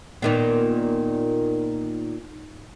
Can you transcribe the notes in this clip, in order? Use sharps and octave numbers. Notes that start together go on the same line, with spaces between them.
A#2 D#3 B3